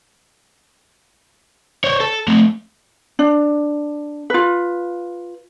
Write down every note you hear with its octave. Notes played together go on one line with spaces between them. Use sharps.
C5 C#5
A4
A3 C4
D4
F4 B4